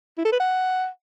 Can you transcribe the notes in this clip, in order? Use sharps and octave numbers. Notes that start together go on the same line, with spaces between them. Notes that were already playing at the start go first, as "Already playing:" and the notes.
E4
A4
B4
F#5